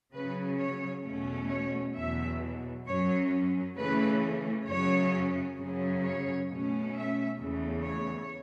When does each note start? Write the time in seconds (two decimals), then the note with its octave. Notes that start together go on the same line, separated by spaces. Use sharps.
0.13 C#3 F#3 C#4 B4
0.59 C#5
1.05 E2 B2 A3 C#4
1.49 C#5
1.95 E2 B2 F#3 E5
2.86 F#2 F#3 C#4 C#5
3.76 C#3 E3 A3 C#4 B4
4.67 F#2 C#3 F#3 C#4 C#5
5.58 F#2 C#3 F#3 C#4
6.04 C#5
6.49 B2 A3 C#4
6.95 E5
7.39 E2 C#3 E3 A3
7.85 C#5